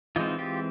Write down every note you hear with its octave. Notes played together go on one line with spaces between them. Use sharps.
E3 G#3 C4 D#4 F4
F4 G4